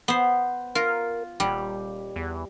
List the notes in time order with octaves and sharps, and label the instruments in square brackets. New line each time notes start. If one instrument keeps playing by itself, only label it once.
[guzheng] B3 C5
[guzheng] F4 [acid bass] A#4
[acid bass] D#1 [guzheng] G3
[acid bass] E2